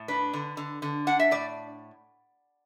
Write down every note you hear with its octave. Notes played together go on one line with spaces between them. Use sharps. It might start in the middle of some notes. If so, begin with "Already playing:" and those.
Already playing: A2
D4 B4
D3
D3
D3
D4 F#5
E5
A2 D5